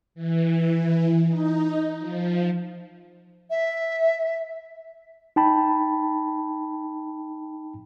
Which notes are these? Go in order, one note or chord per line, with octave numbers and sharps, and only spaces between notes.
E3
D#4
F3
E5
D#4 G5 A5 B5